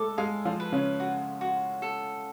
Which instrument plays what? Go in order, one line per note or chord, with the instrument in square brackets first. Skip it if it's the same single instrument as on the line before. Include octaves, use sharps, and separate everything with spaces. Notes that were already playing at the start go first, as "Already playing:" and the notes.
Already playing: [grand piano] G#3 A3 A4 [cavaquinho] D6
[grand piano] G#3 G#4 [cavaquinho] F5
[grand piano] F3 F4
[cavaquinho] B4
[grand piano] C#3 C#4
[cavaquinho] F#4
F#4
A4